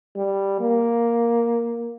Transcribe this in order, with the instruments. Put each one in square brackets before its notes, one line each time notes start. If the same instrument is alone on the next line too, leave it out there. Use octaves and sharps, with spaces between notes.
[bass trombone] G3
A#3